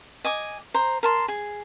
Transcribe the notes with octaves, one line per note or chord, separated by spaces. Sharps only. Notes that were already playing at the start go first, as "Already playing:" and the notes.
D#5 G#5 D6
C5 A#5
A#4 A5 C6
G#4